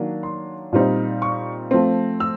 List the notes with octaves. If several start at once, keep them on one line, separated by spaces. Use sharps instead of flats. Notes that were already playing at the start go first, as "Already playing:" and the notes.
Already playing: D#3 F#3 A#3 D4
C6
A#2 G3 C4 D#4
C#6
F3 A3 C4
E6